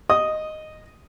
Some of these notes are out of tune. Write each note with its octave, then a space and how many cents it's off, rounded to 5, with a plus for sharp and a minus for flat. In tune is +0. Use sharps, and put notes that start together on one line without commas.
D#5 -5 D#6 +0